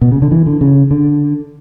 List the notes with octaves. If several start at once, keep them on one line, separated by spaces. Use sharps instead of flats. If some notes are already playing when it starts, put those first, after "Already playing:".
B2
C#3
D3
E3
D3
C#3
D3